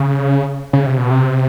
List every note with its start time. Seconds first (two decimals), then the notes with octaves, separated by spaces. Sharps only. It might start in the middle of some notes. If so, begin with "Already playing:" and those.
Already playing: C#3
0.73 C#3
0.86 C3
0.98 B2
1.10 C3